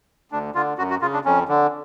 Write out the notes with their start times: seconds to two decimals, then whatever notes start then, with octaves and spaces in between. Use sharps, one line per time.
0.32 D2 D4
0.55 D3 F4
0.78 F#2 F#4
0.90 F#4
1.02 C#3 F4
1.14 D4
1.25 F2 C#4
1.48 D3